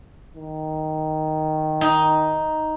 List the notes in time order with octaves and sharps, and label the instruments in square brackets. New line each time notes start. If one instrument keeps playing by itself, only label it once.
[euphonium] D#3
[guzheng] D#4